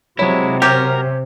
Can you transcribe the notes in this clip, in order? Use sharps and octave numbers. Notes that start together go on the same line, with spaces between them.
C3 F#3 G#3 E4 C#5
C#4 G4 A#4